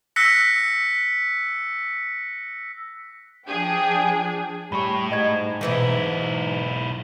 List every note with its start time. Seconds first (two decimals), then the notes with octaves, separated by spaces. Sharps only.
0.16 E6 F#6 A#6 B6 C#7
3.46 F3 D4 G#4 G5
4.72 A2 G3 C#5 B5 C#6
5.12 G#2 D#5 G#6
5.61 B1 B2 E3 D#4 E4